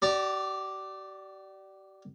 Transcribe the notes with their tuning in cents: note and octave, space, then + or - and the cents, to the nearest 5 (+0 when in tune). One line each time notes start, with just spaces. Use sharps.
G4 -45 D5 +0 A#5 +0